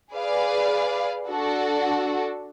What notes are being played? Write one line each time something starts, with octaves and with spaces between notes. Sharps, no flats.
G#4 B4 D5 F5
D4 F#4 A4